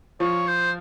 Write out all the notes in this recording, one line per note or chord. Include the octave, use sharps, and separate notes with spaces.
F3 F4 C#5
C5